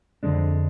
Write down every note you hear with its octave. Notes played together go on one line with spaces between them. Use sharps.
F2 D3 G#3 D4